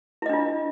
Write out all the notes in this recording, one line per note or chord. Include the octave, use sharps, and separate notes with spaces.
D4 E4 F4 D#5